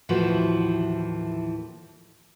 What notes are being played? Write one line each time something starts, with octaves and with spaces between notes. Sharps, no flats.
D#2 A2 E3 F3 F#4